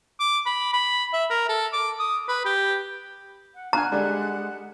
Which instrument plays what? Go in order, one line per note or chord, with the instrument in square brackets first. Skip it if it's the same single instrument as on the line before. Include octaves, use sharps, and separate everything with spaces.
[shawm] D6
B5
B5
E5
A#4
A4
D6
D#6
B4
G4
[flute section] F#5
[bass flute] D4 [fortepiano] F5 G#5 [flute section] F#5 F#6 [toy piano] A#5
[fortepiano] D3 G3 D4 [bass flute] G#3